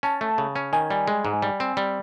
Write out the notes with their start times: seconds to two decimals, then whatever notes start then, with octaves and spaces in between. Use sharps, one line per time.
0.03 C#4 A5
0.21 A3
0.38 C#3
0.56 C#4
0.73 D#3 G#5
0.90 G3
1.08 G#3
1.25 G#2
1.42 G3
1.60 C4
1.77 G3